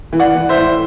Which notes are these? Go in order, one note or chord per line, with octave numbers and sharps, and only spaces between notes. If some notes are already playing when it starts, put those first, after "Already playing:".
E3
D5 F#5
E3
C5 E5
A2